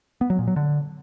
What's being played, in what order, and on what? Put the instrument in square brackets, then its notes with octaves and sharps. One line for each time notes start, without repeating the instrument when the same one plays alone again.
[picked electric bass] B3
F#3
A#2
F#3
D3